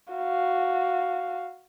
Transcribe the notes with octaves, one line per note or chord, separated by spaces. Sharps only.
F#4 F5